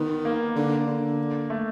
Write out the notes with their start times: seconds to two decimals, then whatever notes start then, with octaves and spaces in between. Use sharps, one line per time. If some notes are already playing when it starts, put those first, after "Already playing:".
Already playing: D#3 B3
0.25 A#3
0.56 D3
0.87 D3
1.50 A3